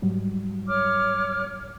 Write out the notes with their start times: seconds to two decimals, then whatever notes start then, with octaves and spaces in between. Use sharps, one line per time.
0.02 G#2 F#3 G3
0.69 C#5 D6 F6